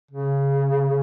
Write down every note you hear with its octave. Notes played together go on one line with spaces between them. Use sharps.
C#3